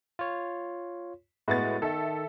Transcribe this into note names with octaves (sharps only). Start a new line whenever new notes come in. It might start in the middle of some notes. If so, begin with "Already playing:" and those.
F4 C#5
A2 G#3 B3 E4 F#4 A6
D#3 A4 E5